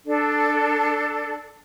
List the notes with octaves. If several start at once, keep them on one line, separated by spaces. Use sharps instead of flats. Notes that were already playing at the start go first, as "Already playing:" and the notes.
D4 A4